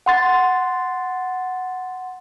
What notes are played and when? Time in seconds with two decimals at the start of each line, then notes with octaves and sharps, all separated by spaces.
0.06 F#5 C6 A6